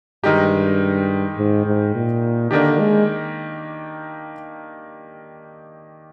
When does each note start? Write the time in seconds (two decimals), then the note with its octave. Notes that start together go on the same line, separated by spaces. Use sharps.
0.24 G2 D#3 G#3 D#4 G4
1.38 G#2
1.66 G#2
1.95 A#2
2.51 D3 D#3 A#3 D4 G4
2.79 G#3